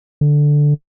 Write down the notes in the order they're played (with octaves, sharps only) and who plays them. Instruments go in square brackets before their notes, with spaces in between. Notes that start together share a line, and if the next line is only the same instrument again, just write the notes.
[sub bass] D3